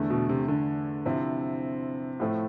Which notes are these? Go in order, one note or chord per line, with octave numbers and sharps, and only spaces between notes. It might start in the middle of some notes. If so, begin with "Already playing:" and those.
Already playing: E2 D3 A3
B2
C3
D3
C3 F3 C4 E4
A2 F3 A3